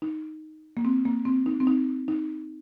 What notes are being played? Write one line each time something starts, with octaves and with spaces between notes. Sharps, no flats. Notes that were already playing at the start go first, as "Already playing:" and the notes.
D#4
A#3
C4
A#3
C4
D#4
C4
D#4
D#4